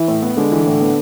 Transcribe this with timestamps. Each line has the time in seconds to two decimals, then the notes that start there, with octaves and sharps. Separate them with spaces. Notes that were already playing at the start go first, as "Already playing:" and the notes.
Already playing: E3
0.08 A2
0.23 B3
0.37 D3 G#3
0.52 E3
0.67 A2
0.81 B3